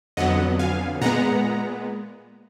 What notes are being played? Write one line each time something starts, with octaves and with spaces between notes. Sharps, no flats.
F2 D3 F#3 B3 D#5 F#5
F5 G#5
A#2 G#3 B3 F#5 A#5